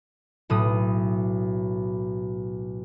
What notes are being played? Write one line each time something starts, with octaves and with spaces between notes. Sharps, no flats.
B1 A2 D#6